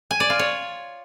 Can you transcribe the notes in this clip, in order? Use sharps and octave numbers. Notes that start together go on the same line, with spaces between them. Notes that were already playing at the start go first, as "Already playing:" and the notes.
G#5
D5
F4
C#5